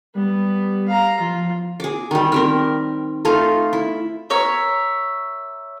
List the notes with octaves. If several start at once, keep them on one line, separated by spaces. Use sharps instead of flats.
G3 B3
F5 A#5
F3 F4
G#4 D6
D#3 G3
C4 G4 A#4
A3 D#4 F4 F5
E4
A#4 C#5 E5